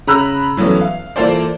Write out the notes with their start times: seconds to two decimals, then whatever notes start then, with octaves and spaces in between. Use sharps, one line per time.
0.07 C#3 A#5 B5 E6 F#6 F7
0.57 E3 F#3 A3 B3 C#4
0.81 F5
1.16 E3 A#3 F4 A4 C5 D5